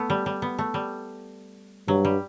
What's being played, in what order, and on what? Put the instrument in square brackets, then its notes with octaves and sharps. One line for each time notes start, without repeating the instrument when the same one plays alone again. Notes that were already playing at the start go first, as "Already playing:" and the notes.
Already playing: [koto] A3 B3
G3
G3
B3
A3
G3
[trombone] G2 [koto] F#3
[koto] G3